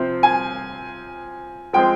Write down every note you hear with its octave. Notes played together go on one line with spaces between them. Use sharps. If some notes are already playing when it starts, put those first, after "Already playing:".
Already playing: C3 F3 C4
G#5
F3 G#3 C4 G5